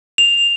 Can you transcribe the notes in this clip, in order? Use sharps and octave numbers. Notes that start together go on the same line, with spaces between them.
F7